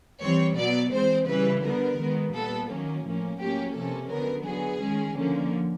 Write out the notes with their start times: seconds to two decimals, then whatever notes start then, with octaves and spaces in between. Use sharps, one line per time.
0.22 E3 G3 C4 C#5
0.58 B2 F#3 B3 D5
0.93 E3 G#3 C4 C5
1.29 C#3 E3 G3 B4
1.64 D3 G3 B3 A#4
1.99 D#3 G#3 B3
2.34 A#2 G3 B3 A4
2.70 D#3 F#3 A#3 C#4
3.05 A2 F3 A#3 C#4
3.40 A2 F#3 A#3 C#4 G4
3.76 C3 F3 A#3 C#4 A4
4.10 D3 F#3 B3 A#4
4.46 D3 F#3 B3 G#4
4.81 D#3 G#3 C#4
5.16 D3 F3 A#3 C#4